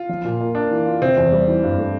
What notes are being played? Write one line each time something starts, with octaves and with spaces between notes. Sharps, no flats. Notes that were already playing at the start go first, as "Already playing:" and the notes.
Already playing: F4
F3
A#2
A#3
A#3 D4
E3
F4
C3 C4
E2
G3
E3
G2
A3